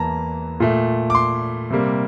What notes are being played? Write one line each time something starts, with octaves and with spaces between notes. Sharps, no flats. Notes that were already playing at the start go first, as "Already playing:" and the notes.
Already playing: E2 E3 A#3 A5 A#5
A#2 A3
D6
C6
C3 G3 A#3